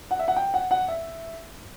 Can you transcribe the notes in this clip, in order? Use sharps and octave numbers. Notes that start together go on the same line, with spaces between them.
F#5
E5
F#5
G5
F#5
F#5
E5